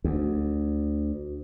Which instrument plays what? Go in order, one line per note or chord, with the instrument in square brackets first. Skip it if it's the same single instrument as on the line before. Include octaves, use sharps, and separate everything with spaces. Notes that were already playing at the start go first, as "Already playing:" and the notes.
[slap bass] D2